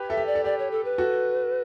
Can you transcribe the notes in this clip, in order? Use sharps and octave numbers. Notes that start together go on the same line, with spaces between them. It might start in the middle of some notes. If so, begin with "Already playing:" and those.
Already playing: G4 B4
A4 E5
G4
D5
A4
G4 D5
C#5
A4
B4
F#4 A4